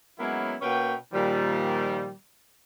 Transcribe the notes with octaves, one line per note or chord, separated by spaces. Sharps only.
F#3 G#3 A#3 B3 C#4 E4
B2 A#3 C#4 B4 G5
A#2 D#3 F3 G3